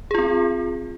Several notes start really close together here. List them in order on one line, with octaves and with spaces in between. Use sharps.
G#4 F4 C4